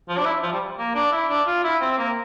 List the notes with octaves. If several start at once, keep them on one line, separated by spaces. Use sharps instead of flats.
F3
D4
E4
F3
G3
A#3
D4
E4
D4
F4
E4
C4
A#3